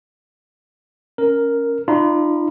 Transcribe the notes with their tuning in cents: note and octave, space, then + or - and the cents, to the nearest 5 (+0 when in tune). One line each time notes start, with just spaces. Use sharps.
C#4 +0 A#4 +0
D4 +45 F4 -30 B5 -45